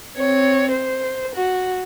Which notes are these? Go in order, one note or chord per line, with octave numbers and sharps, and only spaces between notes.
C4 C#5
C5
F#4